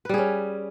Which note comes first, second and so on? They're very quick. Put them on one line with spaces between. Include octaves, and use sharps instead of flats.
B4 G3 G#4 C#4